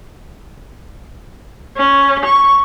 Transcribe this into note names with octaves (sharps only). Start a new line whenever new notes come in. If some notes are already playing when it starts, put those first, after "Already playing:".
C#4
C#6